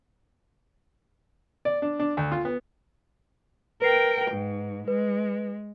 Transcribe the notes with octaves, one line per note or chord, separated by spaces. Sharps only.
D5
D4
D4
D2
F4
B3
A#4 B4 G5 C7
G#2
G#3 B4